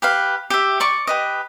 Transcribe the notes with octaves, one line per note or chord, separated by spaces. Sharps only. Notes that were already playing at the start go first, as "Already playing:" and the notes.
G4 B4 F5
G4 E5
D5 C#6 D6
G4 B4 D#5